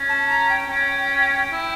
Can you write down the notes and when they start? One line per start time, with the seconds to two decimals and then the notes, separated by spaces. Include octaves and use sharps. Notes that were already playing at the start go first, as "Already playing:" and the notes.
Already playing: C#4
0.09 A5
0.29 A#5
0.49 G5
0.69 C#4
1.52 E4